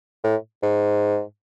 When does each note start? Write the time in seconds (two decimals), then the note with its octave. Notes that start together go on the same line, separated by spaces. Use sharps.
0.24 A2
0.63 G#2